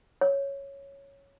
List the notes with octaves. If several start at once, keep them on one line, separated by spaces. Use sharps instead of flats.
C#5